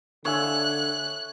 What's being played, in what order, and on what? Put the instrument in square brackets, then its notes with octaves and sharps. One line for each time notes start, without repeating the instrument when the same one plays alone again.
[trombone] D3 [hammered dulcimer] C#5 E5 G#5 [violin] F#6